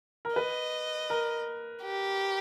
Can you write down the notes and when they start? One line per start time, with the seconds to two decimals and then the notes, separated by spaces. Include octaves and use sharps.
0.25 A#4
0.36 B4 D#5
1.10 A#4
1.83 G4